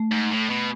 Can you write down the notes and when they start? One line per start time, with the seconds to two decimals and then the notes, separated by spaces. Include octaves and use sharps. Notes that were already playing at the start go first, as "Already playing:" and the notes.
Already playing: A3
0.11 G#2
0.31 A2
0.50 B2